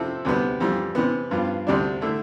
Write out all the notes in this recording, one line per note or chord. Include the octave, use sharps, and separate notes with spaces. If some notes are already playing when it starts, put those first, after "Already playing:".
Already playing: C3 F3 C4 E4 A4
D2 C3 G3 B3
F2 E3 G3
C3 E3 B3
G2 F3 B3 F4
D2 C3 G3 D4
D3 A3 E4